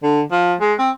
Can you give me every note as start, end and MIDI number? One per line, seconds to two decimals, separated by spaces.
0.03 0.21 50
0.32 0.55 53
0.60 0.73 56
0.79 0.90 60